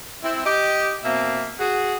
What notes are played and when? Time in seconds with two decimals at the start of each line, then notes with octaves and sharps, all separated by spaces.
0.24 C4 E4
0.45 G4 D#5
1.04 B2 A#3 C4 E5
1.59 F#4 G#4